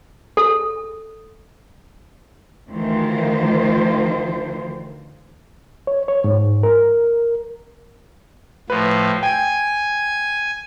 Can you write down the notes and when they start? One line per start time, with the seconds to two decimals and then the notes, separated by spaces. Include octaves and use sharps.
0.37 A4
2.69 D2 D#3 E3 F4 C5
5.87 C#5
6.08 C#5
6.24 G#2
6.63 A#4
8.70 A2 F3 B4
9.23 G5 G#5